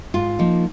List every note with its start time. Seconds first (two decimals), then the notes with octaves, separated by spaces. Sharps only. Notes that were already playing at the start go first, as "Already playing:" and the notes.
0.14 G#2 F4
0.39 F3 A#3 D#4